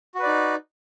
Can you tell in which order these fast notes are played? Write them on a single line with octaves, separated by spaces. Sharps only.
F#4 B4 D5 D#4